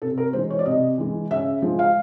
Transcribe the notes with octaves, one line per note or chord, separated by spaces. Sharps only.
C3 A4
A#4
E3 G#3 C5
C#5
D5
C3 D#5
E3 G#3
C#3 E5
F3 G#3
F5